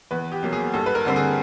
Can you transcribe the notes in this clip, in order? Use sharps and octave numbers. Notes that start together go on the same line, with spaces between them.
E2 B4
G4
B2 F#3 A#3
G#4
G2 A4
B4
A#4
D3 G3 C4
G#4